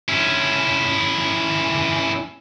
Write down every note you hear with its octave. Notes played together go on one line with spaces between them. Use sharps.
C#4 E4